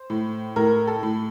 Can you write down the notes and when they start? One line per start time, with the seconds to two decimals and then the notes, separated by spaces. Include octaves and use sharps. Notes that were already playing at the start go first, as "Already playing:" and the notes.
Already playing: C5
0.10 A2
0.56 A2 A#4
0.87 A4
1.03 A2